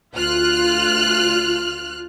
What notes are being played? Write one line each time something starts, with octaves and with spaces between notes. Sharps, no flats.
D2 F4 F6 F#6